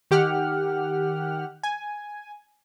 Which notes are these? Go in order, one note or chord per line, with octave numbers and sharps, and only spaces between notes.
D#3 G4 F#5 F6
G#5